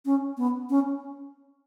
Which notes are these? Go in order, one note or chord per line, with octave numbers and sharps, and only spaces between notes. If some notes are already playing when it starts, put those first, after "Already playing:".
C#4
B3
C#4